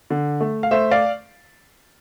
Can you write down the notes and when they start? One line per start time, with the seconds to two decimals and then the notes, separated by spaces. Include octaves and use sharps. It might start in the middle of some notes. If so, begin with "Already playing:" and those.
0.10 D3
0.40 A3
0.63 F5
0.71 A3 C5 E5
0.91 D5 F5